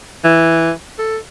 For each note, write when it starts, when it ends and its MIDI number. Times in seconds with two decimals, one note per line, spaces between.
0.24 0.71 52
0.98 1.17 69